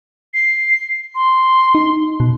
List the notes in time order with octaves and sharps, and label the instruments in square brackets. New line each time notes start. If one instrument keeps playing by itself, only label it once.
[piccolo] C7
C6
[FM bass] D#4
B2